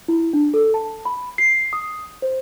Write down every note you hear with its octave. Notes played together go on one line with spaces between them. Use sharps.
E4
D4
A4
A5
B5
C7
D#6
C5